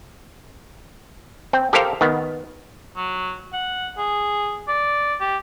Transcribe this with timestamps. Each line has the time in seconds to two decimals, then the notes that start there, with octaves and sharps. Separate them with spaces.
1.53 C4
1.73 G4 A4 A#4 C5 F5
2.01 D#3 B3
2.97 F#3
3.53 F#5
3.98 G#4
4.68 D5
5.20 G4